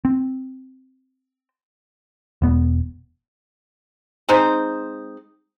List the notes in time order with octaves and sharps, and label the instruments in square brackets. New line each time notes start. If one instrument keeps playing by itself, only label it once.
[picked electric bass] C4
E1 B3
[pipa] G#3 C4 D#4 C5